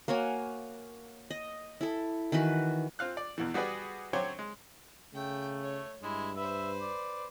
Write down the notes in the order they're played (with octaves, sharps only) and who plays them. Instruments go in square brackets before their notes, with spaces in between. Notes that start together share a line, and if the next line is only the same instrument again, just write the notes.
[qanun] A#3 F#4 C#5 G#5
D#5
E4 A4
D#3 E3 F#4 B4
[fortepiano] C4 F4 F5 F#6
D5
E2 B2 E3
G3 F#4 G#4 B4 D5
F#3 C4 C5 C#5 G5 D6
G#3
[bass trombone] C#3 [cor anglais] A3 [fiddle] G5
[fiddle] C#5
[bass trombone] G2 [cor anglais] G#3 [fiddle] E4
[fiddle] B4 C5 [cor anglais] E5
[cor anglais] D5